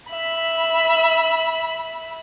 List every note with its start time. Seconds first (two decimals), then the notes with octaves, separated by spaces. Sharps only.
0.11 E5 B5